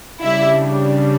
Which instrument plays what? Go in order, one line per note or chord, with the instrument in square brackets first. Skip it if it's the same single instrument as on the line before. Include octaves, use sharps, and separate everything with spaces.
[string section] C#3 G3 D4 E4 E5